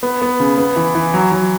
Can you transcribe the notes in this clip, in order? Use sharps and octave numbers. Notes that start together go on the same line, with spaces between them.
B3
B3
C#3
B3
E3
E3
F#3
F#3